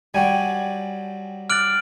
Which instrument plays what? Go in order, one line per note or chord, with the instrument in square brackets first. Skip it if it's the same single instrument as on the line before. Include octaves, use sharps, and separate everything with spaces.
[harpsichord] F#3 G3 [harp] G5 G#5
[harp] D6 F#6 A6 [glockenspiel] F6 D7 F#7